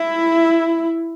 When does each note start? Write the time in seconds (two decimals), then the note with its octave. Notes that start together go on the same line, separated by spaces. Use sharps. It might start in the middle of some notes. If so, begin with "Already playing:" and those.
Already playing: E4